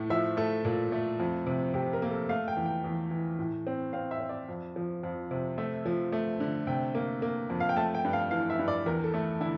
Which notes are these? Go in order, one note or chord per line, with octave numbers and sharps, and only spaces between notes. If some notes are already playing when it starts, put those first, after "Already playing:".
Already playing: A2 A3
F3 E5
A3 A4
A#2
A3
F2
C3
C3 G4
A#4
A#3
A4
A3 F5
G5
E2
G5
E2
E3
A2
C4
C4 F5
E5
C4
D5
F2
F3
F2
C3
A3 E5
F3
A3
D3
C3 G5
A#3
A#3
F2
F5
G5
A3 A5
G5
G2
F5
E3 F5
E5
G2
D5
E2 A#4
A4
A3
D3 E4